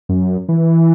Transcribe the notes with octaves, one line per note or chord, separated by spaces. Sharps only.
F#2
E3